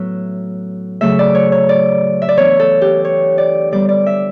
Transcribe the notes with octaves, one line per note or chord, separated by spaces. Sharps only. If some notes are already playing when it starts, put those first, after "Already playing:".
Already playing: A2 F#3 B3 E5
C#3 F#3 A3 E5
D5
C#5
C#5
D5
E5
D5
E3 B3 D4 C#5
A4
G4
C#5
D5
D3 G3 B3 D5
D5
E5